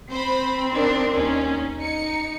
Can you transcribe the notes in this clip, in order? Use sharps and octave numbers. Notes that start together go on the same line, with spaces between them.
C4 C5 B5
D#3 D4
D#2 C#4 D#4
D#4 C#7